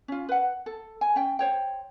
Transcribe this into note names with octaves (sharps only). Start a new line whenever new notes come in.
C#4 F4
B4 F#5
A4
G#5
C#4 G5
C5 C#5 G5